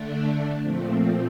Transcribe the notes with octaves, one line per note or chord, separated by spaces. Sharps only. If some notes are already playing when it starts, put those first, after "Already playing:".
Already playing: D3 A3 D4
A#2 F3 A3 C4